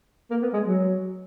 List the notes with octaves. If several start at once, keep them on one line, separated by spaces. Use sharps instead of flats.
A#3
B3
G#3
F#3